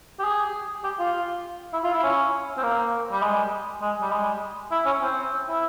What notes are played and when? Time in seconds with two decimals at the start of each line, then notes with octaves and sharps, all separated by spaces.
0.20 G4
0.24 G#4
0.84 G4
0.99 F4
1.73 E4
1.84 F4
1.93 E4
2.03 C#4
2.57 C4
2.63 A#3
3.12 G3
3.22 G#3
3.82 G#3
4.02 G3
4.11 G#3
4.71 E4
4.86 C#4
5.01 C4
5.49 E4